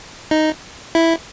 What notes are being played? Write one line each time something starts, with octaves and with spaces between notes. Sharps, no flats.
D#4
E4